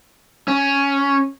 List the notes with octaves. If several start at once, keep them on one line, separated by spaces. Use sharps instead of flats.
C#4